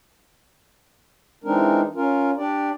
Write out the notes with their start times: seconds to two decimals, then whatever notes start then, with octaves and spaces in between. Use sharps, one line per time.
1.44 E3 G#3 C4 D4 D#4 A#4
1.95 C#4 F4 A#4
2.36 D4 G4 D5